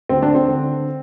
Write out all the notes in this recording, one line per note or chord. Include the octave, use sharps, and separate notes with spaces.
D2 C4
D4
C4
D3